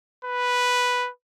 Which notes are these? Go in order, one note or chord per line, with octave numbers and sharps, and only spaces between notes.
B4